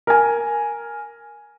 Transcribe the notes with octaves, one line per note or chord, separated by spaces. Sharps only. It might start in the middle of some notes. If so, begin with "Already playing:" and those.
A#4 G#5